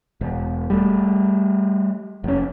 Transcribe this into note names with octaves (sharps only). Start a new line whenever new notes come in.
E1
G3 A3
F1 C#4